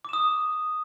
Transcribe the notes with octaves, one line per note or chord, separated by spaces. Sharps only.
D6 D#6 E7